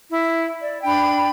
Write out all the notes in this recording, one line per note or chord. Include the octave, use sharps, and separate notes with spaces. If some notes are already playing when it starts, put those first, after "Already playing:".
E4
D5
D4 G5 B5